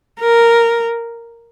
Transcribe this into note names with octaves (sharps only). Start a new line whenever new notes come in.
A#4